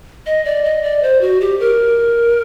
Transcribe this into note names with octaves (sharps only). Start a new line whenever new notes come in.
D#5
D5
D#5
D5
C5
F#4
G4
A#4